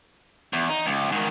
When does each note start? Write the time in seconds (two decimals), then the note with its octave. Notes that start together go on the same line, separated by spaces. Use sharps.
0.53 E2
0.69 D#4
0.86 C#2
1.12 G#2 D#3